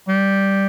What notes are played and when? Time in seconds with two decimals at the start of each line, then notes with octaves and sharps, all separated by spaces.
0.09 G3